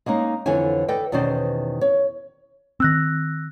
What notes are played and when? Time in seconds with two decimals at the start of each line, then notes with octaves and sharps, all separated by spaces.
0.06 G#3 A#3 C#4 D#4
0.46 F2 D3 E3 E4 C#5 G#5
0.88 A4 B4 D5 D#5 G5
1.12 E2 B2 D#3 C#4 C5 D5
1.81 C#5
2.80 D#3 C4 E6 F#6 A#6